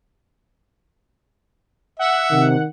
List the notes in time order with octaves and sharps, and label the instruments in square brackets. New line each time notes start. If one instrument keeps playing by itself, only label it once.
[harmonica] E5 [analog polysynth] F#5
[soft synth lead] C3 [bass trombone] D#3